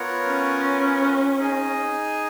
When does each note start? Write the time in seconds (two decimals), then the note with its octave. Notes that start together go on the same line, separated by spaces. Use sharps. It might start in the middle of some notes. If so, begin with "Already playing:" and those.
Already playing: B3 F4 A#4 C#5 F#5
0.27 C#4
1.39 D#4 G#4 D#5 G#5